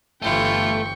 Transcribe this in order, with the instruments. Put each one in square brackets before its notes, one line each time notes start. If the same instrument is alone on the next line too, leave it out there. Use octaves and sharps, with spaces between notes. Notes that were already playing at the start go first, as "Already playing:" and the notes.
[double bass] G1 E3 [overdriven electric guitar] A3 [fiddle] E4 F4 [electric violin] G5 C#6